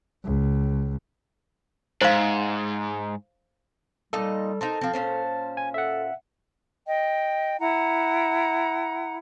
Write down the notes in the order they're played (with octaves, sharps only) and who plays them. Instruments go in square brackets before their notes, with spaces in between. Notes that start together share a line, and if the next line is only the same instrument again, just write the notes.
[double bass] C#2
[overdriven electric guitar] G#2 [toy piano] C5 F5
[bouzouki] A#2 D#4 D#5 [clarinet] G3 [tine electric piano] A4
[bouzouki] D#4 A#4 C5 [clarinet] A5
[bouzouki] F3 C4
A#2 C#4 C5
[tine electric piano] G#5
[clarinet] A4 [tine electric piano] E5 F#5
[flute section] D#5 G5
E4 F#5 A#5